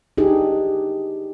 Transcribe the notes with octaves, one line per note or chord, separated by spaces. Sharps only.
D4 D#4 G4 G#4